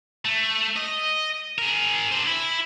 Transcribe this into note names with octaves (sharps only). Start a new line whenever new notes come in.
A3
D#5
G#4 A#4
D4 C5
E4